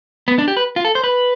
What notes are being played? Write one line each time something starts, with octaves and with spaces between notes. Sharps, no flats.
B3
D4
G4
B4
F4
A4
C5
B4